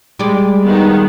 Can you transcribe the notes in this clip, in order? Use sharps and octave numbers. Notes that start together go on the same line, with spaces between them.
G3 G#3 D5
D#3 B3